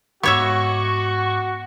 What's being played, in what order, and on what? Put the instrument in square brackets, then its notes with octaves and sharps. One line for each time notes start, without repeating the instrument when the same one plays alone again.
[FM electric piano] G#2 D6 [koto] B3 C#5 E5 [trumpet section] F#4 [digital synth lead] C#6